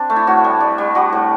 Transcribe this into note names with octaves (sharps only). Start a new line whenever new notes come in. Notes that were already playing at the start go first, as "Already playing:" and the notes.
Already playing: C4 D4
A3
E4
A2 F#4
G3
G3
G3
G3 F#4
A2